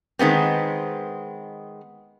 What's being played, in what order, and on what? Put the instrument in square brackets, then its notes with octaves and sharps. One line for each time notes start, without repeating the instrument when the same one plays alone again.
[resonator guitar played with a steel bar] D#3 G#3 B3 C4